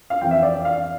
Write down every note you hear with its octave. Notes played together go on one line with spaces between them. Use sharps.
F5
F2 E3 G5
E5
D5
F5